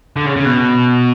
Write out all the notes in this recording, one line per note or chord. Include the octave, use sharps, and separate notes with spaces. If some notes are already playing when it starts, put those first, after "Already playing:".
D3
C#3
C#3
B2